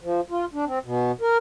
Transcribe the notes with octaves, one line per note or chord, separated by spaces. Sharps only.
F3
F4
D4
C4
B2
A#4